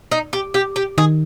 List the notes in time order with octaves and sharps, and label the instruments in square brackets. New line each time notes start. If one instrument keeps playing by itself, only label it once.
[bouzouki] D#4
G4
G4
G4
[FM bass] D#3 [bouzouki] G#4